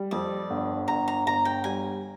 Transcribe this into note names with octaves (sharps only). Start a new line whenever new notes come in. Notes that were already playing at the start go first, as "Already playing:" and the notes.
Already playing: G3
F2 D5
G1
G1 A#5
A#5
G1 A#5
G5
G3 G#5